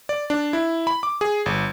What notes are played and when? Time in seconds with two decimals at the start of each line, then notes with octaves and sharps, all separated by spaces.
0.09 D5
0.30 D4
0.53 E4
0.87 B5
1.03 D6
1.21 G#4
1.46 G1